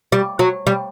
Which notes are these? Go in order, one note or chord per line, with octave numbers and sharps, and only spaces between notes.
G3
F#3
G3